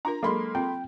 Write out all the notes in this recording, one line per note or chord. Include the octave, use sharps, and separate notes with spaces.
D4 F4 A#4 A#5
F#3 G#3 A#3 A4 B5 C6
C4 F4 G5